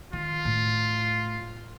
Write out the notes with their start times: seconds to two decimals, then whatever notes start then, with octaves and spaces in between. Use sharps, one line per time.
0.13 D#3 F4
0.45 A2